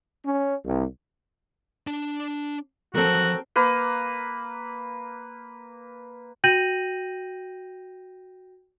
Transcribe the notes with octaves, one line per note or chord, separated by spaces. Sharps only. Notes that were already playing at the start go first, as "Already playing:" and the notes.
C#4
C2
D4 A5
F3 F#3 C4 F#4 A4 A#4
A#3 B4
F#4 G5 G6 A#6 D#7 F#7